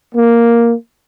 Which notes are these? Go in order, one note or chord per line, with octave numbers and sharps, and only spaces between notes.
A#3